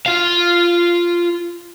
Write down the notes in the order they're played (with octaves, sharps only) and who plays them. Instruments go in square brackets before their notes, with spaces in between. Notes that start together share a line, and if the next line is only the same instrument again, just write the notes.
[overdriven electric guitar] F4 F5